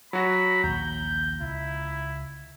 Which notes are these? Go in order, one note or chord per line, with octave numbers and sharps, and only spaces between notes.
F#3 F#4 B5 A#6
A#1 D#2 A#5 G6
C#2 E4